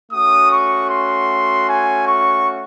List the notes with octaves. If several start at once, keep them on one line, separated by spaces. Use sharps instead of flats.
A3 C#4 F#4 D#6
C#6
C6
G#5
C#6